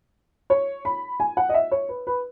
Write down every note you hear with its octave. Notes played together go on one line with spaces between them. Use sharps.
C#5
B5
G#5
F#5
D#5
E5
C#5
B4
B4